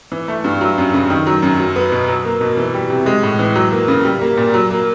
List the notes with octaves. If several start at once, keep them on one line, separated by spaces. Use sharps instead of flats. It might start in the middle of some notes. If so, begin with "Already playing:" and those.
E3
A3
G2
F#3
F#2
C#3
D#3
F#3
F#2
F#3
B3
B2
F#3
A#3
B2
E3
G3
C3
G#3
A2
E3
F#3
A#3
C#3
G3
A#3
A#2
F#3
A#3